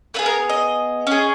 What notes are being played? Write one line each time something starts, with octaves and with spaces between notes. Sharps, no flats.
B3 E4 G#4 B4
A#4
D#5
C#4 G#4